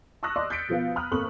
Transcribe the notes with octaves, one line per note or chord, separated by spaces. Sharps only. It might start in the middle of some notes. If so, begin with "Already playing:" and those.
A5 C#6 D#6 E6 F#6 A#6
D5 D#5 C6 D6
G6 A6 B6 C#7 D7
B2 F3 B3 F5
A#5 B5 D#6 F6 F#6
G#1 A#3 A4 B5 C#6 F#7